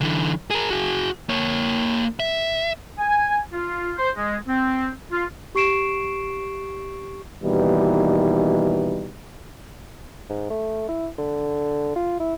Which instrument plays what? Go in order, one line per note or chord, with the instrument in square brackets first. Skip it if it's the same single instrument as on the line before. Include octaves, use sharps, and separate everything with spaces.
[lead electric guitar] D3 E3
G#4 A#4
F#4 G#4
A#3 C#5
E5
[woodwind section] G#5
F4
C5
G#3
C4
F4
[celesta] G4 C#6 C7 D7 E7
[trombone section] D#2 B2 E3 G3 D#4
[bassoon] G#2
A3
E4
D3
F4
E4